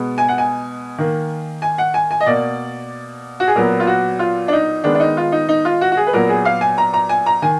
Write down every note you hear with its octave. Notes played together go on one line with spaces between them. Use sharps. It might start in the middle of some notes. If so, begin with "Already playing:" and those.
Already playing: B2 G#3 B3
G#5
F#5
G#5
D#3 A#3
G#5
F#5
G#5
G#5
D#5
B2 A#3 D5
F#4
G#4
A#2 F#3 B3 A#4
F4
F#4
F4
D4
D#4
D#3 G#3 B3 D4
D4
D#4
F4
D#4
D#4
F4
F#4
F#4
G#4
B4
A#2 F#3 B3 A#4
G#4
F5
G#5
A#5
A#5
G#5
A#5
D#3 G#5